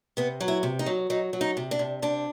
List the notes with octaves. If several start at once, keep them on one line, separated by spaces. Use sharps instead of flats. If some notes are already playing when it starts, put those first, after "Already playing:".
C3 B3
F#3
E4
C3
D#4
F#3
F#3 D#4
F#3
D#4
C3
D4
C3
C3 D4